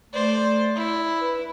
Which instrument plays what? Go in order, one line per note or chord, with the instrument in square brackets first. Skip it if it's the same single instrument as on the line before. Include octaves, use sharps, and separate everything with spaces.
[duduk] A3 [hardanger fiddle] C5 D5
[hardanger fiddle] E4
[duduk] B4